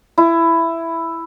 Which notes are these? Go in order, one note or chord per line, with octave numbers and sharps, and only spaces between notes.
E4